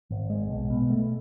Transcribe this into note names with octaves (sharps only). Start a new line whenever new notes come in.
G#1
G#3
B1
B2
A3